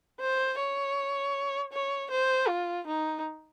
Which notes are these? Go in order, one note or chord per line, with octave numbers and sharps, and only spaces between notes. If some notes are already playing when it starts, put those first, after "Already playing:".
C5
C#5
C#5
C5
F4
D#4